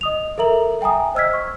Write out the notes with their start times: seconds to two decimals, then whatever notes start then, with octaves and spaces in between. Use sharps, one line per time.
0.01 D#5 D#6 F7
0.38 A4 A#4 E5 A#5 F#7
0.81 E5 G5 G#5 A#5 D#6
1.15 C5 D#5 E6 F6 G#6 B6
1.33 C#6